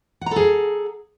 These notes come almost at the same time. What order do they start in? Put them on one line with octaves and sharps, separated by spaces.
F#5 A#5 A4 G#4